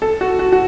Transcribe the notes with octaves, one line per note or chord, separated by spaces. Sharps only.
A4
F#4
F#4
F#4